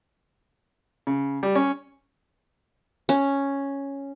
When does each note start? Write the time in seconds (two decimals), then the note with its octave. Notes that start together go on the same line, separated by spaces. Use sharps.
1.07 C#3
1.43 G3
1.55 C#4
3.09 C#4